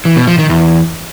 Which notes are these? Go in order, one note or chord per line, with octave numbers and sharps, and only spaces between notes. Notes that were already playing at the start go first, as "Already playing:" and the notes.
E3
B2
F3
D#3
E2